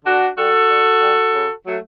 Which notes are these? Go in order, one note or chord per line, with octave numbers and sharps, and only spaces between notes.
D3 D4 F#4
G3 F#4 A4
D3
G3
C#3
F#3 A3